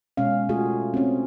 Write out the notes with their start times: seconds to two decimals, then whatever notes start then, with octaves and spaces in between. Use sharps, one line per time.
0.17 B2 G#3 C#4 F5
0.49 A3 F4 F#4 G#4
0.94 C4 C#4